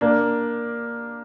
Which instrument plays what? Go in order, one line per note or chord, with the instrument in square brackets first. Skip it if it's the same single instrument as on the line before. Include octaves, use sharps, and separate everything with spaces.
[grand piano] A#3 D4